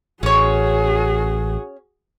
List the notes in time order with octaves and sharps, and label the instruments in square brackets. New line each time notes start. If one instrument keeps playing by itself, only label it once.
[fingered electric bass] A1 [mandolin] C#4 C#5 [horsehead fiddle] F#4 G#4